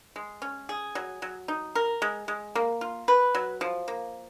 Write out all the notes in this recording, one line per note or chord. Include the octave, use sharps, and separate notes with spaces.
G#3
C#4
G#4
F#3
F#3
D#4
A#4
G#3
G#3
A#3
F4
B4
F#3
F3
A#3